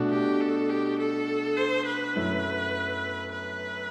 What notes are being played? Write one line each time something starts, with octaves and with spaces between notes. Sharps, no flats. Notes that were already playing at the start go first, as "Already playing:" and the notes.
Already playing: B2 A3 D4 F#4
G4
A4
G4
A4
C5
B4
F#2 F#3 A3 E4
B4